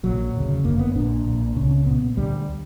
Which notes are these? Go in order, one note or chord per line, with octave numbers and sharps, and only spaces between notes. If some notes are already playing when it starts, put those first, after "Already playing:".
A#1 A#2 F#3
E1 D2 C#3
G1 F#2 D3 A#3
B3
A#1 A#2 D4
A#1 A#2
C#2 C#3 C#4
C#4
B1 A#2 B3
D2 D3 G3